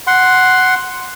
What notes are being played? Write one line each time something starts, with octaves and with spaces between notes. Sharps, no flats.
F#5 C6